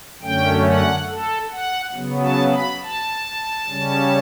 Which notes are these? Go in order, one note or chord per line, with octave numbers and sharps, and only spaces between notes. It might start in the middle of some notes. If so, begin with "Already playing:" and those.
F#2 D3 A3 C#4 G5
F#5
A4
F#5
C#3 F#3 B3
A5
B5
A5
C#3 G3 C#4